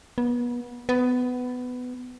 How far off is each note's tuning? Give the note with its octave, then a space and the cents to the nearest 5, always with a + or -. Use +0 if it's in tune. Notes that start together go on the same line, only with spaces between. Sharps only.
B3 -30
B3 +15